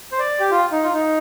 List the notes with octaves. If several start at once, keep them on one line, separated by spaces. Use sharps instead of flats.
C5
D5
G4
F4
D#4
F4
D#4